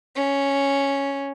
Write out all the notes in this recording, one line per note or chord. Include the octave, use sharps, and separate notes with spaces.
C#4